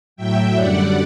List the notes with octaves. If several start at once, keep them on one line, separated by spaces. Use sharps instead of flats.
A2 F#3 E5 G5
F#2 D3 G3 D5 F#5